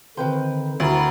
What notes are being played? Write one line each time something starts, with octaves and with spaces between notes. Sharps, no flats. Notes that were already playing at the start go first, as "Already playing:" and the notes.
D3 D#3 C4 B4 C5 G5
D2 E4 F#4 A#4 A#5 B5 A6